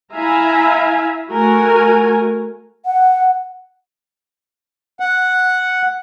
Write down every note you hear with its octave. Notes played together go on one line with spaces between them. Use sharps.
E4 E5 F5 G#5 A#5
A3 F#4 A#4 G#5
F#5
F#5